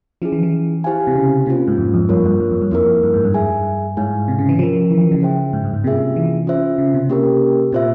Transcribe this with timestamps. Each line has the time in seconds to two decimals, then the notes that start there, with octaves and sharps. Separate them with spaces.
0.22 F3 C#4 E4 G#4
0.32 E3
0.43 E3
0.84 E4 G4 C5 F5 G#5
1.07 C3
1.16 C#3
1.46 C3 A#3 C#4 F4 C5
1.68 G#2
1.78 F2
1.94 F2
2.09 G2 A#3 F4 A#4 C#5
2.26 G2
2.40 G2
2.51 F2
2.62 G2
2.71 F2 A#3 E4 A#4
3.03 G2
3.14 G#2
3.24 G2
3.34 G#4 E5 G#5
3.97 G#2 E4 G#4 C#5 F5 G#5
4.28 C3
4.39 C#3
4.49 E3
4.59 F3 C#4 F4 A#4
4.90 E3
5.01 E3
5.12 C#3
5.21 G#4 C5 E5 G5
5.53 G#2
5.64 G2
5.74 G#2
5.84 C3 A#3 C#4 F4 G#4 E5
6.16 E3
6.47 C#4 F4 C5 E5
6.78 C#3
6.94 C3
7.09 A#3 C#4 G4 A#4
7.72 A#2 C4 F4 C5 E5